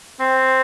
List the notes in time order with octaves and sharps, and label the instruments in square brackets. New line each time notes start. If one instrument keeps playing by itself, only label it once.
[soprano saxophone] C4